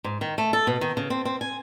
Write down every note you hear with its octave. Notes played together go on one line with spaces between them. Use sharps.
G#2
D#3
A3
A4
B2
D#3
C#3
C4
C4
G#5